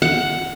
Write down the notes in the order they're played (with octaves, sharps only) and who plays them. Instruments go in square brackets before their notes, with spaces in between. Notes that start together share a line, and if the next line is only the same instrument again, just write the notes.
[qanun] F#5